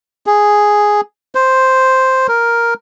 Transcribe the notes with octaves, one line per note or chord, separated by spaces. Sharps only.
G#4
C5
A#4